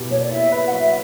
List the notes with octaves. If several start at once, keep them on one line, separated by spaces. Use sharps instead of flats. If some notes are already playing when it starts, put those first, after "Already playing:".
Already playing: B2 E4 G4
A#3 C#5
D5
E4 E5
B4
F#5
F#3 E5